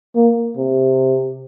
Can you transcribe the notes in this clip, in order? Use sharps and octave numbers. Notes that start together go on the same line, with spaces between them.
A#3
C3